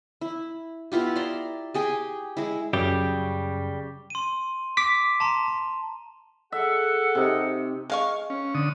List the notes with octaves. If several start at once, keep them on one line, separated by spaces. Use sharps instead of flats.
E4
B3 E4 F4 G4
D5 E5 A#5 C6
G4 G#4 G5 G#5
G#3 E4
F#2 C#3 G3 G4
C6 D#7
D6 B6
A5 A#5 C6
G#4 A4 E5 F#5
C3 D#4
G#3 F5 C#6
C#4
D3 D#6